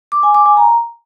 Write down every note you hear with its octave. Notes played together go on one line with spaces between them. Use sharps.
D6
G#5
D6
G#5
A#5